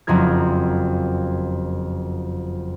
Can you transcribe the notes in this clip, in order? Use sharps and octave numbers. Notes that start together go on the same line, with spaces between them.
F#1 F2 F4 A#4 G#6